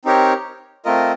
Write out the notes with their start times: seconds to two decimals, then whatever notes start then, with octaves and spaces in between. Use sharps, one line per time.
0.05 C4 D#4 G4 A#4 C#5
0.85 A3 C4 F4 A#4 D#5